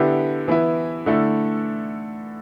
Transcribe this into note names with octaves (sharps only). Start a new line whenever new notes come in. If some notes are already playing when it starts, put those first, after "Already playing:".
Already playing: D3 B3 E4 G4
E3 B3 E4
D3 A3 E4